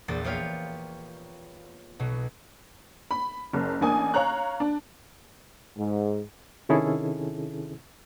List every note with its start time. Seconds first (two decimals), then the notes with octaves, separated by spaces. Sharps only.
0.08 A#1 E2 A#3 A6
0.24 A#3 B3 F4 G4 C#5 F5
1.99 B1 B2
3.11 B5
3.53 F#1
3.81 A1 A#3 D4 G#5 D#6
4.14 C#5 F5 A#5 F#6
4.60 D4
5.78 G#2
6.69 C3 D#3 C#4 E4 G#4 A4